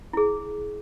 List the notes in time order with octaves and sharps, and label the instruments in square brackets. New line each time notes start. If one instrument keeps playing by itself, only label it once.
[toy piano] E4 G#4